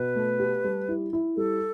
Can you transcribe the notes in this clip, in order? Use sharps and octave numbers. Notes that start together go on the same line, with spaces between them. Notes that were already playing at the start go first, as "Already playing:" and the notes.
Already playing: B2 B4
A3
G4
G3
E4
E4
G3 A4